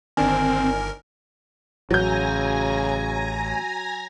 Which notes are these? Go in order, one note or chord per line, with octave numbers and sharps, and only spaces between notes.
G1 D#3 C4 D4 A#4 G#5
A1 C#3 F#3 G#5 A#5 G6 A#6